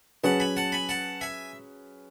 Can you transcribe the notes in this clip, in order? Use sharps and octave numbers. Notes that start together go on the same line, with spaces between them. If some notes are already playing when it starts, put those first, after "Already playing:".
F#3 C#4 G#4 B4 F#5 A5
G#5 B5
F#5 A5
G#5 B5
F#5 A5
E5 G#5